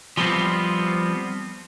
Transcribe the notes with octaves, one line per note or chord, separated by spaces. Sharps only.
F3 G3 B3 C4 F4